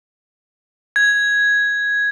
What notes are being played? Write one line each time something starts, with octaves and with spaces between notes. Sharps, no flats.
G#6